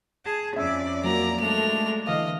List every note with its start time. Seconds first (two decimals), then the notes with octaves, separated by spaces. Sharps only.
0.25 G#4 A5
0.56 F2 C#4 D5 E5
1.04 F#3 A#3 F#4 A#5
1.40 G#3 A3 D4 F7
2.07 D3 E3 D#5 F5